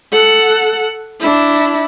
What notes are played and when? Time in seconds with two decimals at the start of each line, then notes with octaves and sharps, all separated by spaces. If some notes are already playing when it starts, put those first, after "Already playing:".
0.12 A4 F#5
1.20 D4 E4